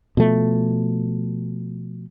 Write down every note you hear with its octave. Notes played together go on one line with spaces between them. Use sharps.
B2 F3 A3